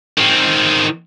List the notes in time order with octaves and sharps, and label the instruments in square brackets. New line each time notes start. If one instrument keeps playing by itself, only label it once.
[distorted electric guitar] D#3 C4